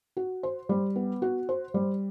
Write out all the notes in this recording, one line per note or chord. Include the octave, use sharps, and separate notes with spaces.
F#4
C5
G3
B3
F#4
C5
G3